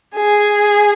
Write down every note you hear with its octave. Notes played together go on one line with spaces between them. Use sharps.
G#4